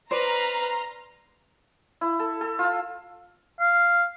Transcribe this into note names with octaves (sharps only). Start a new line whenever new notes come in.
B4 C5 D5 A#5 C6 F6
E4
A4
A4
F4
F5